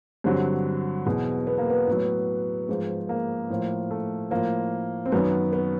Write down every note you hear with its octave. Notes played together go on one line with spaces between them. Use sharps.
G2 D3 F#3 C4
E2 B2 F#3
B3
A#3
B3
A2 F#3
G#2 F3
A#3
A2 F3
A3
A2 F3 A#3
C4
F#2 D#3 F#3 B3
B3